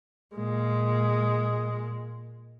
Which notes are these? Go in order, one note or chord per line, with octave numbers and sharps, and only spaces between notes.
A#2 G#3